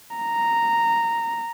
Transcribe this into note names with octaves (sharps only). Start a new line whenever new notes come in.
A#5